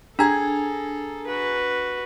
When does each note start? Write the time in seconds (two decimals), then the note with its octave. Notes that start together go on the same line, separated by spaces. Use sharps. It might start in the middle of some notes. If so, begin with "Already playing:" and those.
0.19 D4 G#4 A4 A#5 G#6
1.26 F#4 B4